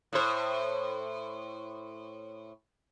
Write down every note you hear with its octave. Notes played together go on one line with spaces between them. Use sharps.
A2 C5